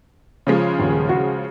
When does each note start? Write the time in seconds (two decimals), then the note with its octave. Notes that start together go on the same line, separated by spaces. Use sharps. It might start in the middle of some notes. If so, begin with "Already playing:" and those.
0.47 C#3 F3 G#3
0.79 D#1
1.09 F#4